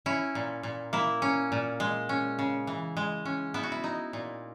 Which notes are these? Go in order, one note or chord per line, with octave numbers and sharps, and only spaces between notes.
C#4 E4
A#2
A#2
A#3 E4
C#4
A#2
G#3
C#4
C#3
E3
G#3
C#4
B3 E4
F#4
E4
D#4
A#2